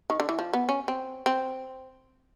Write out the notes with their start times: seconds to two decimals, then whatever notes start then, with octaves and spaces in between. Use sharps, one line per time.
0.10 D#3
0.20 D3
0.29 E3
0.39 F3
0.53 B3
0.69 C#4
0.88 C4
1.26 C4